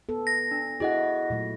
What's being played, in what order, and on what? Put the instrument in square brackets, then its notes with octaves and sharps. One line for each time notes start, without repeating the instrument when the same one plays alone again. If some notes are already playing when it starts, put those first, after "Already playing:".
[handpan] B3 A4
[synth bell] A#6
[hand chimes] D4
[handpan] E4 F#4 [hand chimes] G#4 D#5 F#5
[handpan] A#2 F#3 A3